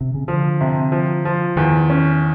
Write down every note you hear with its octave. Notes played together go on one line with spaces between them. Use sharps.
C3
C#3
D3 F3
C3
F3
F3
E2 D#3
C#4